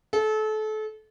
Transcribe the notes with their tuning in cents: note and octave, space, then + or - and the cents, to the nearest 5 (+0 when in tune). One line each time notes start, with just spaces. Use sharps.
A4 -30